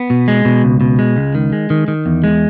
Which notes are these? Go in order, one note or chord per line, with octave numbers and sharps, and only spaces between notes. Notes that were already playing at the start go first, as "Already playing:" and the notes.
Already playing: B3
B2
G#3
B2
C#2
B2
G#3
C#2
D#3
G#3
D#3
D#3
E2
G#3